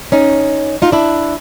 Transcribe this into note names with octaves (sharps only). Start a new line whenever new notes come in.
C#4 D#4
D#4 F4
D4 E4